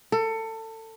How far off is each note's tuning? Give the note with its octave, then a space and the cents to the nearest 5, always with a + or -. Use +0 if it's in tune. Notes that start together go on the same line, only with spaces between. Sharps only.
A4 +25